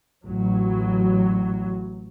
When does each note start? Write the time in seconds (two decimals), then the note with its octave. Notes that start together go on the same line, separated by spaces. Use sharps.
0.25 A1 F#3